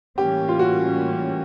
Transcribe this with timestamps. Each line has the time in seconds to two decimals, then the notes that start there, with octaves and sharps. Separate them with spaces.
0.18 A2 E3 G3 A#3 C#4 G4
0.49 F4
0.59 F#4